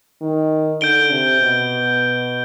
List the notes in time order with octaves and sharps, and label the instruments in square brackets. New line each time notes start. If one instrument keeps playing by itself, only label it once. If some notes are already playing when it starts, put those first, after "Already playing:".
[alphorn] D#3
[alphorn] D3 [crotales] G6 D7 G7
[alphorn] C3
B2